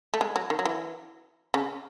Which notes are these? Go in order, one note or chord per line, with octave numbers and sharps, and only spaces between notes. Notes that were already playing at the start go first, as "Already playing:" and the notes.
A3
G#3
F#3
D#3
F#3
E3
C#3